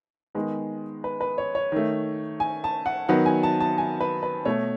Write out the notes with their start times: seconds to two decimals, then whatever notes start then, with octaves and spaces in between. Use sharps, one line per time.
0.35 D#3 G#3 B3
1.04 B4
1.21 B4
1.38 C#5
1.55 C#5
1.72 D#3 A3
2.40 G#5
2.64 A5
2.86 F#5
3.09 D#3 F#3 B3 F#5
3.26 G#5
3.43 A5
3.60 A5
3.78 G#5
4.00 B4
4.23 B4
4.45 B2 A3 C#5